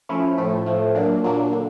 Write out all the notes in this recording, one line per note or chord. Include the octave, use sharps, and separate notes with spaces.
F3 A3 C#4 E4
A2 F3 A3
A2 F3 A3
A#2 F#3 A#3 D4
A#2 F#3 A#3 D4
D3